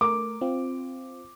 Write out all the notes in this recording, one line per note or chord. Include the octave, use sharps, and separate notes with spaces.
A3 A#4 D6
C4 F4